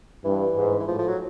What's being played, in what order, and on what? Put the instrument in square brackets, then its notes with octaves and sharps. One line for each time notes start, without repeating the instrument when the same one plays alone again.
[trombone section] G2 [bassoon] E3
[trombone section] G#2
[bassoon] E3
[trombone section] A2 [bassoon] F3
[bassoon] F3
F#3